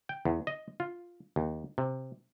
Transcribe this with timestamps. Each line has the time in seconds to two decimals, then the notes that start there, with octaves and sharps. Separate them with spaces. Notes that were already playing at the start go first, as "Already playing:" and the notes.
0.09 G5
0.25 E2
0.47 D#5
0.80 F4
1.36 D#2
1.78 C3